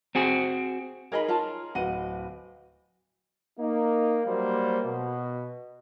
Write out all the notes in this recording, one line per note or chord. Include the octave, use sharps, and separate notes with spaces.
C4 F#4 G#4
D#4 G#4 A#4 C#5 D#5 B5
F4 C#5 A5
D1 B4 D#5 F#5 D#7
A#3 D#4
F#3 G3 A#3 C5
B2